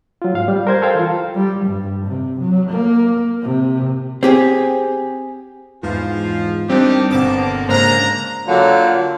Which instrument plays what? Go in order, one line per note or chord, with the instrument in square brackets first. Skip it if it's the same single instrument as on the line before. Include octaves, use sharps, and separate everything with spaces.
[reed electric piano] F#3 F4
G#2 F5
G3
A#4 C5 G#6
A4 C5 F5 G5
E3 F4
[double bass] G3
G2
C3
F#3
A#3
C3
[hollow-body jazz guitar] C4 G4 G#4
[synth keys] E2 [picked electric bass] G#2 [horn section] F3 F4
[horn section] D#3 D#4 G4 [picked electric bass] G3 [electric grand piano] C4 D4
[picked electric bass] G1 [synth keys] B2 A5 D6 [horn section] D3 F3 A#3 [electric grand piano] C4
[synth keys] G#2 A#3 F6 [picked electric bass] C#3 [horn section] D4 A#5 [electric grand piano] C5
[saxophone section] D3 F#3 A#3 F4 F#4